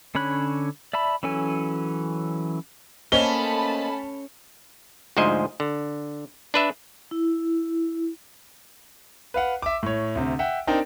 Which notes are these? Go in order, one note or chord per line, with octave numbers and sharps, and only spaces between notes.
D3 C#4 C#5 B5 F#6
D5 E5 A5 B5
E3 F#3 C#4 A4 G#5
A3 A#3 C#4 C5 D#5 A5 B5 G7
D2 G#2 F3 C5 D#5 G#5
D3
D4 B4 E5
E4
B4 F5 F#5
E5 D6
A2 C#5
D2 C3
E5 F#5 G5
C4 D4 D#4 A#4 G5